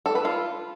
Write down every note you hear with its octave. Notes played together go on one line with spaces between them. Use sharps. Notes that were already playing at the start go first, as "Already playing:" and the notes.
A4
B4
F4